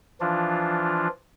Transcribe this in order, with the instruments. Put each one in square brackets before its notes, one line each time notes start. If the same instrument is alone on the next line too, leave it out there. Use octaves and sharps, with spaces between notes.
[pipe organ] E3 F3 D4 F4